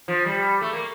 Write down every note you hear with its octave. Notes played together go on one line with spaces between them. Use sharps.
F3
G3
A3
A#3